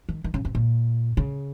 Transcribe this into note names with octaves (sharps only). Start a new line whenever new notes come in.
D#3
D#3
C#3
C3
A#2
C#3